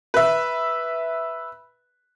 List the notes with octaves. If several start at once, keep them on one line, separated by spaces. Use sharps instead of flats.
B4 E5